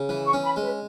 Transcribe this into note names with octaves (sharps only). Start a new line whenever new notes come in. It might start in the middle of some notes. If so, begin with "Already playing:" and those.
Already playing: C#3
E3
C#6
C#4
B5
G#3
B4